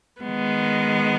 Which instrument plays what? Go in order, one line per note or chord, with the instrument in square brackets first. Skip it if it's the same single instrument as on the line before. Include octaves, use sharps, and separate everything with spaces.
[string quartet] D#3 G#3 B3